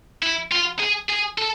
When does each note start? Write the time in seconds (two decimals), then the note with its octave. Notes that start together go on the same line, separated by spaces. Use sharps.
0.23 E4
0.52 F4
0.80 G#4
1.10 G#4
1.38 A4